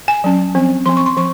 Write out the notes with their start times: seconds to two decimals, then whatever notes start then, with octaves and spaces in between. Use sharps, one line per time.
0.08 G#5
0.24 F#3 C#4
0.55 F3 C4
0.86 F3 C4 C6
0.97 C#6
1.06 C6
1.17 F3 C#6